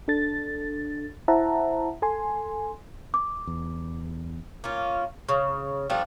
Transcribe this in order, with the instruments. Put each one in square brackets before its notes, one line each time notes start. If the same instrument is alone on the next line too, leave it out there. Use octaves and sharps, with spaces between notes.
[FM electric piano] D4 A4 A6
E4 C5 E5 F#5 A5 A#5
A4 G#5 C6
[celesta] D6
[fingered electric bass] E2
[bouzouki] A#3 C#4 F4
C#3
F3 G3 A3 D4